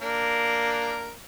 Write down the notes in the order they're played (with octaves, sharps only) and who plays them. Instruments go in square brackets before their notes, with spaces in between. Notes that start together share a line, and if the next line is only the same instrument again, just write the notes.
[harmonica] A#3 D4 A#4